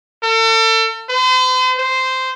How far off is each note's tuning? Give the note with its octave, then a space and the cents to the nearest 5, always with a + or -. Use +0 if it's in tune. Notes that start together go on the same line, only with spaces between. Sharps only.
A4 +40
C5 -40
C5 -10